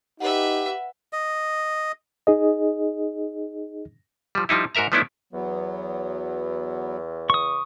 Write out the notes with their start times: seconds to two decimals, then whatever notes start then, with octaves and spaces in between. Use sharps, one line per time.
0.20 D#4 G4 B4 E5 F#5
1.13 D#5
2.27 D#4 G#4 D#5
4.35 F3 G3
4.49 F3 G3 D#4 E4
4.75 G#2 F#4 A#4 E5 A#5
4.92 F3 A3 B3 C#4 D4 E4
5.33 E2 F#3 B3
7.30 C#6 D#6